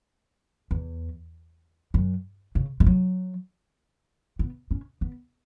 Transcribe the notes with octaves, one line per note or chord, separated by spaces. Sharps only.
E2
F#2
C#3
G#3
F#3
B3
C#4
B3